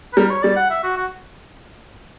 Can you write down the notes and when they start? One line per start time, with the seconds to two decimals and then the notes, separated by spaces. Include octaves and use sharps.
0.13 B4
0.17 G3 A#4
0.30 C#5
0.43 G3 D5
0.56 F#5
0.70 E5
0.84 F#4
0.97 F#4